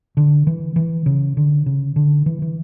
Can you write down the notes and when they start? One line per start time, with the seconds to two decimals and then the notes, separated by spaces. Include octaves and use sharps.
0.17 D3
0.47 E3
0.76 E3
1.06 C#3
1.37 D3
1.66 C#3
1.96 D3
2.26 E3
2.42 E3